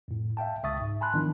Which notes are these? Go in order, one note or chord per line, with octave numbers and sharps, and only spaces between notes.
F2 A2
E5 F5 G5 A5
C#2 E5 C#6 D#6 A6
G#2
G#5 A5 B5 C6 F#6
D#3 F3 B3 D4 E4